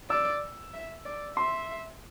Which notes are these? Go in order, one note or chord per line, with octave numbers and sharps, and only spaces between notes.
D5 E6
E5
D5
E5 C6